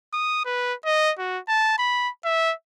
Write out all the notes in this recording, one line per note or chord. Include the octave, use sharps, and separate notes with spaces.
D#6
B4
D#5
F#4
A5
B5
E5